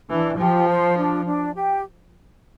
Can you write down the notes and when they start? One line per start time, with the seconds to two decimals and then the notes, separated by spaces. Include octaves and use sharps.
0.10 E3 D4
0.39 F3 G4
0.68 C5
0.97 D4
1.25 D4
1.55 G4